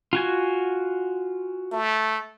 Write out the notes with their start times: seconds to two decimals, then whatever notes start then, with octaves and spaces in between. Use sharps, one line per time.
0.13 F4 F#4 G#5
1.72 A3